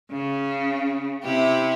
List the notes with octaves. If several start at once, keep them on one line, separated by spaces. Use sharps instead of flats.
C#3
C3 E4 G4